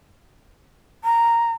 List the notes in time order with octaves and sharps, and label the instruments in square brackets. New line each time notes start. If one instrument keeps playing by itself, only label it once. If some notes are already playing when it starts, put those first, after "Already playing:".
[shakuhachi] A#5